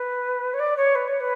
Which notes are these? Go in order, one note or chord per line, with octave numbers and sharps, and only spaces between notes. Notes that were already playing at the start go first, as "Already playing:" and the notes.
Already playing: B4
C#5
D5
C#5
B4
C#5
B4